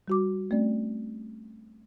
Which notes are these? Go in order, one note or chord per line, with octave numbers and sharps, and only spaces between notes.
G3 F#4 D6
A3 C4 C#4 D5